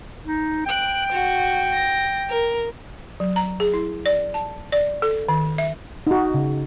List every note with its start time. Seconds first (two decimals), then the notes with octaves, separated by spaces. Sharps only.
0.25 D#4
0.66 G5 F#6 D7
1.12 F#4
1.73 A#6
2.30 A#4
3.20 F#3
3.36 A#5
3.60 G#4
3.74 E4
4.06 D5
4.34 A5
4.72 D5
5.02 A4
5.29 D#3
5.58 E5
6.07 D#4 F#4
6.34 C#3